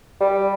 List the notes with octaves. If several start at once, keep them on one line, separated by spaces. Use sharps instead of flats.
G3